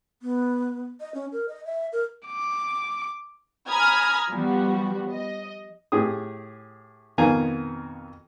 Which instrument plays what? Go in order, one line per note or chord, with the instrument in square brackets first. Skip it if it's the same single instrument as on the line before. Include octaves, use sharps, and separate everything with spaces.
[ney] B3
D#5
C#4
A#4
D#5
E5
A#4
[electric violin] D6
[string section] G#5 A#5 B5 D#6 F6 G#6
F3 G3 B3 F#4
D#5
[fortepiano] A2 G4 G#4 D#6
F2 B2 D#3 F5 G#5 A#5